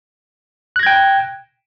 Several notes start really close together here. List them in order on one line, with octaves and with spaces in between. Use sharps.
F#6 A#6 G#6 G5